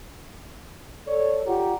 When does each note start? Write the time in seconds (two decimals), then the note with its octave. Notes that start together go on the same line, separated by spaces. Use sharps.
1.07 A4 C#5 D5
1.47 F4 G4 F#5 A#5